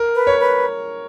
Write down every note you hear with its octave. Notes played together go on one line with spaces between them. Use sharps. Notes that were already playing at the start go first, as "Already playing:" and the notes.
Already playing: A#4
B4
C#5
B4